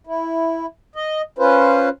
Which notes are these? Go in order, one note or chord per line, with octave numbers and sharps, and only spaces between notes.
E4
D#5
C#4 F4 B4 C5